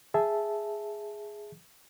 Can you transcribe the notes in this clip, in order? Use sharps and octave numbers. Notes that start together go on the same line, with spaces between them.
G#4 E5 A5